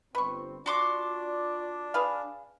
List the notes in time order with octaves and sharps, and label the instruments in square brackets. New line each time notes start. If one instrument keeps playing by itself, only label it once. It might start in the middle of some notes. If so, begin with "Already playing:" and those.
[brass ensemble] G1 C4 [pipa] B4 C#6
[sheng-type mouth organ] D4 [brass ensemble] F4 D5 [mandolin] F#4 C6 D6
[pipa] G#4 B4 F5